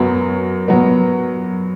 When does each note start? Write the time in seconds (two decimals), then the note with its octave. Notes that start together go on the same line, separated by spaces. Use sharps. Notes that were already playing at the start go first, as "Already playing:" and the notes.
Already playing: F#2 F#3 B3
0.68 F#3 B3